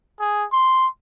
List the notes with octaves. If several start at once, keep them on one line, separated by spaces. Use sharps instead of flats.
G#4
C6